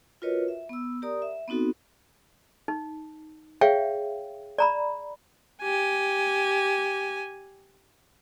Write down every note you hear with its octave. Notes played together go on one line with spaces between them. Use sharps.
F4 F#4 A#4 B4 C#5 D#5
E5
B3 E6
G4 A#4 D5 A#5 D#6
E5
B3 C4 D#4 F#4 A4
D#4
G#4 C#5 E5 F5 G5
D5 A#5 B5
G4 G#5